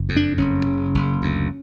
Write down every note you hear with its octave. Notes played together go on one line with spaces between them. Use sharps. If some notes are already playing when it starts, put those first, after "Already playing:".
Already playing: F#1
F2
D4
F#1 C#4
C#3
F#1
D2